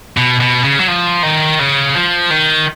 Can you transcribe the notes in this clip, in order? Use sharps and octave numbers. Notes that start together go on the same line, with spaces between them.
B2
B2
C#3
F#3
F3
D#3
C#3
F3
D#3